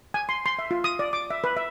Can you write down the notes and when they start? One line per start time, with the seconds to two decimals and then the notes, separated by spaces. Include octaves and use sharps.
0.14 G#5
0.29 C6
0.46 C6
0.59 E5
0.71 F4
0.84 D#6
0.99 D5
1.13 D6
1.30 E5
1.44 B4
1.57 E5